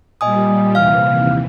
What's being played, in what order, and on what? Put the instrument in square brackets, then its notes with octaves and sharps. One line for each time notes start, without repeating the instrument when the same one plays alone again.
[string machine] A#2 G3 [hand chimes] D#5 G#5 D#6
[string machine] D#2 C3 E3 [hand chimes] F5 F6